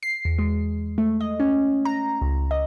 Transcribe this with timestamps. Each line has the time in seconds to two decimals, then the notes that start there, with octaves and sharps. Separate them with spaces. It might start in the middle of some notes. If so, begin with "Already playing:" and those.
0.03 C7
0.25 E2
0.38 G#3
0.98 A3
1.21 D#5
1.40 C#4
1.85 A#5
2.21 C#2
2.51 D#5